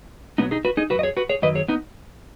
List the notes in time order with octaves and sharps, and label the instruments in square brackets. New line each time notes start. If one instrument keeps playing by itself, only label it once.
[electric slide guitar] B2 F#3 B3 D#4
D#4 G#4
F#4 B4
D#4 G#4
F#2 D#3 F#3 F#4 B4
D#5
G#4 C#5
F#4 B4
G#4 C#5
F#2 D#3 F#3 B4 D#5
G#4 C#5
B3 D#4